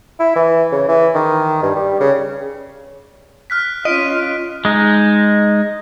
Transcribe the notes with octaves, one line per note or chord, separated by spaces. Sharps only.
E4
E3
C#3
E3
D#3
G2
G3
C#3
F6 F#6 B6
C#4 F4 D#5 F6 B6 D7
G#3 D#4